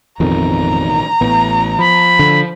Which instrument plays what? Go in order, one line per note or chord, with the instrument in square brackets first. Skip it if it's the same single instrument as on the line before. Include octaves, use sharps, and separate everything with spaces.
[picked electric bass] A1 B2 D#3 [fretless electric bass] F2 [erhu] A#5
[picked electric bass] A1 A2 [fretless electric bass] B3
[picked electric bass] F3 [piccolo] B5
[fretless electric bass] D3